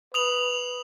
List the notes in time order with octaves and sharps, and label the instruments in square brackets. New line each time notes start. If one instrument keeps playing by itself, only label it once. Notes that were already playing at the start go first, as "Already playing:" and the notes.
[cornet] B4 [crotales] D#6 F7 F#7